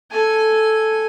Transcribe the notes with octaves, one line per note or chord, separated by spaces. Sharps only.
A4 G#5